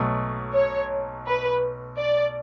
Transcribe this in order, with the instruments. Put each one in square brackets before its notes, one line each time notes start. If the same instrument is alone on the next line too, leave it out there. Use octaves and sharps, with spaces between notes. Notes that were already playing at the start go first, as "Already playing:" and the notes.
Already playing: [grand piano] B1 B2 F#3 A3
[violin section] C#5
B4
D5